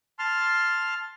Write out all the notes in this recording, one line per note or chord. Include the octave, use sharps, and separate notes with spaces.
A5 C6 F6